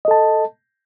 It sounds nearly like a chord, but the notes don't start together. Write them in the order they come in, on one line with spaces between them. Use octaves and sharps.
D#5 A4 A5